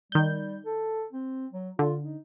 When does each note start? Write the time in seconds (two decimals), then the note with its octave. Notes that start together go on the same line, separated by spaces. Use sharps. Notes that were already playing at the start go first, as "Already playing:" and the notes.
0.12 D#3 G3 G6
0.66 A4
1.12 C4
1.53 F#3
1.79 D3 F4
2.03 D#4